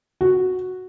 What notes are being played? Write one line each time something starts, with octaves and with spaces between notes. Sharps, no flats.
F#4